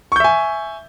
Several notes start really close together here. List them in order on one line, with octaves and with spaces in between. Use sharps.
C#6 G6 E5 G#5